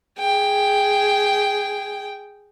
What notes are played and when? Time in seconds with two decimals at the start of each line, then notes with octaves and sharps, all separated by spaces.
0.19 G#4 G5